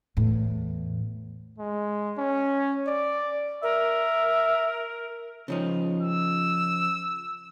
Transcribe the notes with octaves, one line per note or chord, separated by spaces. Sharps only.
E2 A2
G#3
C#4
D5
A#4 E5
C#3 F3 D#4
E6